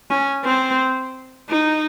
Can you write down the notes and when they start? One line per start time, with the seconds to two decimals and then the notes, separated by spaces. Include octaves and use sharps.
0.10 C#4
0.45 C4
1.50 D#4